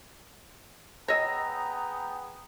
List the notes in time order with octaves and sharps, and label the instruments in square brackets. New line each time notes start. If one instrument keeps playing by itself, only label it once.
[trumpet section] B3 G#4 G5 [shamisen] C#5 D#5 [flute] A#5 [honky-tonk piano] E6 A#6